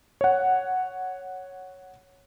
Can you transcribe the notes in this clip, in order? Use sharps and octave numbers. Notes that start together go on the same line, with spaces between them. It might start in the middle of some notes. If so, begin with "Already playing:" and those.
C#5 F#5